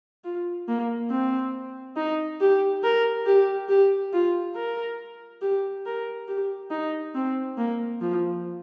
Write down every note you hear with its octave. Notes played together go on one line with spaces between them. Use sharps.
F4
A#3
C4
D#4
G4
A#4
G4
G4
F4
A#4
G4
A#4
G4
D#4
C4
A#3
F3